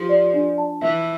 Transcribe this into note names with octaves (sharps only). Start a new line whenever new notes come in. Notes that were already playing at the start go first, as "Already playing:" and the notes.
Already playing: F3 G4
D5
D4
A5
E3 E5